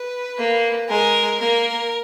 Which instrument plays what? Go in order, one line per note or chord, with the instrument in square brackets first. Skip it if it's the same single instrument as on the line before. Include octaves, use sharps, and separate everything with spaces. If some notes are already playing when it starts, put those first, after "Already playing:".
Already playing: [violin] B4
[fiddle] A#3
[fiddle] G#3 [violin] A#4
[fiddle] A#3 [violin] A#4